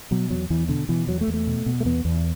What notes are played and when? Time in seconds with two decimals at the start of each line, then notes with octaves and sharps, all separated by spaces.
0.11 B2 F#3
0.30 E2 F#3
0.50 E2 E3
0.69 B2 D3
0.89 B2 E3
1.07 E2 F#3
1.21 A3
1.28 E2
1.34 A3
1.47 B2
1.66 B2
1.80 A3
1.85 E2 B3
2.05 E2